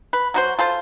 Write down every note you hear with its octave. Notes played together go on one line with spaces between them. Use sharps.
B4
F#3 F#4 C5
F4 A4 C5